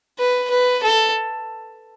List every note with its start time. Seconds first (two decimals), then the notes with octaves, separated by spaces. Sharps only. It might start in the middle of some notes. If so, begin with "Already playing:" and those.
0.19 B4
0.50 B4
0.83 A4